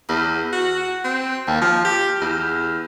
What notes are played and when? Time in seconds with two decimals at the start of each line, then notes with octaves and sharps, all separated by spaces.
0.08 E2
0.53 F#4
1.04 C4
1.47 D#2
1.61 F3
1.84 G4
2.21 E2